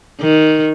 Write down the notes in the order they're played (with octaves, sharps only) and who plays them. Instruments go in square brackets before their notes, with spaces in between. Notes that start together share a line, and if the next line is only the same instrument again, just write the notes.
[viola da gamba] D#3